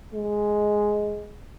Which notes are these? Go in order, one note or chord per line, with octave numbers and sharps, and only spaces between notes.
G#3